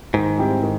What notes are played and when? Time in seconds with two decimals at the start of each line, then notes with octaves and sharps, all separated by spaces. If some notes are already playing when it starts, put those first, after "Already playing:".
0.13 G#2 D#3
0.38 G3 C4 E4 G4
0.63 D#3